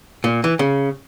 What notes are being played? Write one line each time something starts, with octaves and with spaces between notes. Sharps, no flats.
A#2
E3
C#3